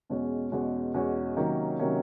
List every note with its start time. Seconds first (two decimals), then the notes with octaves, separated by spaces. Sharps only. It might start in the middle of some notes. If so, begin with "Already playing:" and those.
0.10 E2 B2 G#3 C#4 F#4
0.52 E2 B2 G#3 C#4 F#4
0.94 E2 B2 G#3 C#4 F#4
1.37 C3 D#3 F#3 A#3 C#4
1.79 C3 D#3 F#3 A#3 C#4